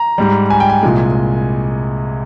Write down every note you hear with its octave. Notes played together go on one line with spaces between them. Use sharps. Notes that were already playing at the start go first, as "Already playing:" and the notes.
Already playing: A#5
G#2 G3
G#5
G5
G#5
C2 A#2 G#3